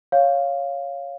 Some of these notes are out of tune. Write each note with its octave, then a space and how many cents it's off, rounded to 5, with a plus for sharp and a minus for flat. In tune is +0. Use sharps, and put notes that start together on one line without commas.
C#5 +0 F5 +0